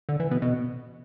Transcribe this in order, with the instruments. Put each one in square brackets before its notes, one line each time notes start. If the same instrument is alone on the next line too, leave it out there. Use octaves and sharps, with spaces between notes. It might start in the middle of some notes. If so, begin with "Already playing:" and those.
[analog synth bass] D3
E3
B2
B2